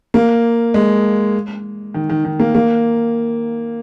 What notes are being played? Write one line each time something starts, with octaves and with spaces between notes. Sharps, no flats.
A#3
G#3
D#3
D#3
D#3
A#3
A#3